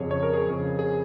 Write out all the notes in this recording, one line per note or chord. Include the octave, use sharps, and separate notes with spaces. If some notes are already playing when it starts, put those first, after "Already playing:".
Already playing: F2 C#3 G#4 C#5
C#5
A#4
G#4
F2 C#3
G#4